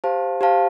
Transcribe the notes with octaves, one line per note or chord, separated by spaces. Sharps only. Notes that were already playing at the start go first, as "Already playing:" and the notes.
G4 C5 F5 A5
G4 C5 F5 A5